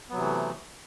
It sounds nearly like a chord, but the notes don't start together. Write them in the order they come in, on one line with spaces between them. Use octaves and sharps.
B3 F#3 C3 E3 A3